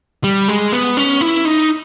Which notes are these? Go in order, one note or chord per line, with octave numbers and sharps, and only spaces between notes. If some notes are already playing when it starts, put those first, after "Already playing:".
G3
G#3
B3
C#4
E4
D#4